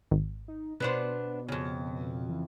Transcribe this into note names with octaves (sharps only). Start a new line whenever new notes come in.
G#1
D#4
B2 B3 D4 C5
F2 C#3
E3